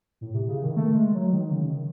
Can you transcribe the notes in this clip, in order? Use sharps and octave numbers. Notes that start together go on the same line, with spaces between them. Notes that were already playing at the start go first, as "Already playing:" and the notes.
A2
C3
C#3
D#3
A3
G#3
F#3
D#3
D#3
C#3
D#3